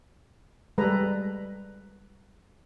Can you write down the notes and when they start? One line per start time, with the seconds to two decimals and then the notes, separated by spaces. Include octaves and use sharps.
0.78 G3 G#3 A4 B4 A#5